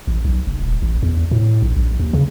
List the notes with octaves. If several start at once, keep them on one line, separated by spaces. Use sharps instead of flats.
A1
B1
F1
D#1
A1
E2
A2
A#1
A#1
D#2
C#3